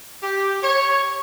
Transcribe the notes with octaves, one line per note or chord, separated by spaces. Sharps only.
G4
C#5